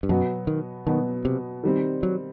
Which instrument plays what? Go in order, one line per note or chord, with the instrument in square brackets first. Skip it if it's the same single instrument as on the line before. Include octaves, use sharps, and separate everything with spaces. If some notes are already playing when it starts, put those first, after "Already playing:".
[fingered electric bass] G2
[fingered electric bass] F#2 [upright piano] B2 F#3 B3
[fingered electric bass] D#3
[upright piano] B2 F#3 B3 [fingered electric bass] D#3
[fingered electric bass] C3
[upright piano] D#3 G3 C4
[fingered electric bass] F#3